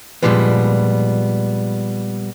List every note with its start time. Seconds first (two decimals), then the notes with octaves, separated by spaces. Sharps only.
0.23 A#2 D3 F3 G3 G#3 B3